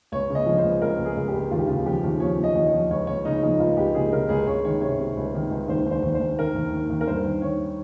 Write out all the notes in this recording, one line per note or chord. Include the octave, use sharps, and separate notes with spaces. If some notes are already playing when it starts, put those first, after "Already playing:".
C#2 C#5
C#3
D#5
F3
C5
C#2
C#2 A#4
C#2
G#4
C#2
G4
C#2
D#2 F4
G4
C#3 F4
F3 G4
D#2
F3 C#5
F3
D#5
D#2
C#5
F3
C#2 C#5
C#2 C#5
C#3 D#4
F3 D#4
C#2 F4
C#2 G4
C#3 G#4
C#3 A#4
C#2 G#4
C#2 C#5
D#3 C#5
C3 C#5
C3
C#2
D#3
C#2
D#2 C5
D#2 C5
D#2
C5
D#2
D#3 A#4
D#2
D#2
D#2
A#4
G2 C5
D#3
D#3 C#5